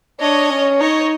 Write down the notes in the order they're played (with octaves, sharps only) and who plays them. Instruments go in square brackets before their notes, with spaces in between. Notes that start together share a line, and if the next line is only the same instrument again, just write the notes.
[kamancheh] D4 [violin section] C#5 D#5
[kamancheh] C#4
[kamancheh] D#4 [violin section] C#5 D#5